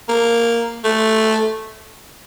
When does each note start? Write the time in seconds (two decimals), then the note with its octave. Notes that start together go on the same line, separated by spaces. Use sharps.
0.08 A#3
0.84 A3